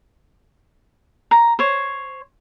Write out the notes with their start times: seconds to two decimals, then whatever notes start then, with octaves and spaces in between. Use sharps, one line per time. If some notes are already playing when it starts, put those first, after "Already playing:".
1.31 A#5
1.59 C5 C#5